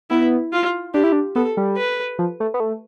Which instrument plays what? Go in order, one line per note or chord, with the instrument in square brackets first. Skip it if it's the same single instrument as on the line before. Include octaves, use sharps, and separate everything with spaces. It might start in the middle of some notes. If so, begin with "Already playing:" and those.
[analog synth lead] B3 [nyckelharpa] E4
[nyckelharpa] F4
[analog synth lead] D4 [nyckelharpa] G4
[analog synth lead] E4
D4
[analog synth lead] B3 [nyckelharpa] A4
[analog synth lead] G3
[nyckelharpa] B4
[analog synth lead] F3
A3
B3
A3